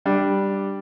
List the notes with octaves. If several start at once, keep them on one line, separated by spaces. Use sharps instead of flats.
G3 D4